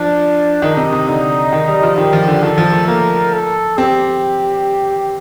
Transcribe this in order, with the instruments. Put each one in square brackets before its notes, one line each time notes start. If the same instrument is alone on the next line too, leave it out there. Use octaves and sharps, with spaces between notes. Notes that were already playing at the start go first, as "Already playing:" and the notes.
Already playing: [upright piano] F3 [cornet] D4
[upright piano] D#3 [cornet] D#4
[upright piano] C3
C3
[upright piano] D3 [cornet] D#4
[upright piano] D#3
G3
F3
[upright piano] D#3 [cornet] G4
[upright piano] F3
D3
[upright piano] D#3 [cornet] A4
[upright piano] F3
A3
[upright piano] A#3 [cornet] A#4
[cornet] A4
[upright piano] C4 [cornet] G4